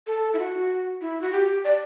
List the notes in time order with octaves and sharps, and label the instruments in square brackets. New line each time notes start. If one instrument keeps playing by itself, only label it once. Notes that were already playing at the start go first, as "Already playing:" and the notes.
[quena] A4
E4
F#4
E4
F#4
G4
D5